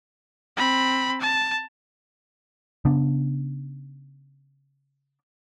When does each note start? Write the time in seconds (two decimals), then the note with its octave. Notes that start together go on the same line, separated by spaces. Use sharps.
0.57 C4 B5
1.21 A5
2.85 C#3 B3 D4